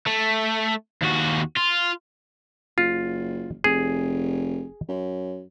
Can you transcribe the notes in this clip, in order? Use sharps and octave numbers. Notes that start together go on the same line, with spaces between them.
A3
D#2 F#4
F4
F#1 F4
F1 G#4
F#2